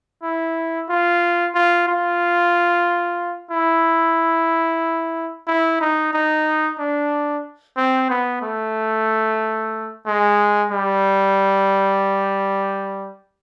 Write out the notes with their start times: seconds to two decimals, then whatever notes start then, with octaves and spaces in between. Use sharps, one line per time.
0.23 E4
0.89 F4
1.55 F4
1.88 F4
3.51 E4
5.47 E4
5.81 D#4
6.13 D#4
6.78 D4
7.77 C4
8.10 B3
8.42 A3
10.06 G#3
10.72 G3